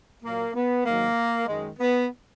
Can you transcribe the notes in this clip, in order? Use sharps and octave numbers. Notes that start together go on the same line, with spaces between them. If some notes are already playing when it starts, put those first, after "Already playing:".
A#2 F#3 A#3
B3
G#2 D#3 F#3 A#3
F#2 D#3 G#3
B3